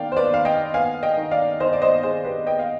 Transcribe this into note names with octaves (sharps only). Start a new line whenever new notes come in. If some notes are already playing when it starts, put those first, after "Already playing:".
Already playing: D#3 D5 F5 G5
C5
B4 D5
D#3 F5
D#5 G5
B3 F5 G#5
D#5 G5
D#3
D5 F5
D#3 C5 D#5
D5
C5 D#5
D#3 G#4 C5
G4 B4
B3 D#5 G5
F5